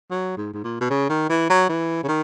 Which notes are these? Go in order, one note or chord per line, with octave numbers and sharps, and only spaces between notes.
F#3
G#2
G#2
A#2
B2
C#3
D#3
E3
F#3
E3
C#3
D#3